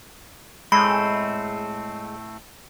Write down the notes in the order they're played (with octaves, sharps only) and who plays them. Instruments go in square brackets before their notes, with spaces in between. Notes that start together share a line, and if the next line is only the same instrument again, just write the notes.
[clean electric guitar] A2 A3 C4 [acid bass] G#3 [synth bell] B5